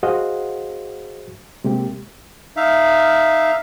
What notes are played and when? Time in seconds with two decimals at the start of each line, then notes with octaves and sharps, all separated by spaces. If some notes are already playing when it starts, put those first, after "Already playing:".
0.03 F#4 G#4 C5 D#5 F5 F#5
1.64 C3 G#3 A#3 G4
2.56 D#4 E5 F5